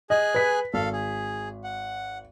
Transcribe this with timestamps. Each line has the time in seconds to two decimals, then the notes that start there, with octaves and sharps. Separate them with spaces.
0.10 G#4 D#5 G#5 F#6
0.35 B4 B6
0.74 G#1 A4 F5
0.93 G#4
1.64 F#5